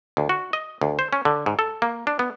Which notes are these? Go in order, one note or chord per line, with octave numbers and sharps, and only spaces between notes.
D2
F#4
D#5
D2
C5
C#4
D3
G#2
A4
A#3
D4
B3